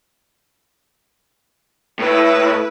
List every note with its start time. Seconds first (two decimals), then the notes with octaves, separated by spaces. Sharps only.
1.99 A2 E4 B4